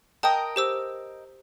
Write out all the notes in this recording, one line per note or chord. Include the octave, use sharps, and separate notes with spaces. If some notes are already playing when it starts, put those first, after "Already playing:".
A#4 D#5 G5 A5 D#6
G4 C5 E6